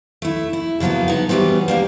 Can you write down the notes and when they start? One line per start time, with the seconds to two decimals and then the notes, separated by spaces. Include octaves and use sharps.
0.22 A3 E4
0.53 E4
0.80 C#3 F3 F#3 A#3 B3
1.08 B3 D#4
1.29 E3 F#3 G3 B3 C4
1.68 A#3 D4 G4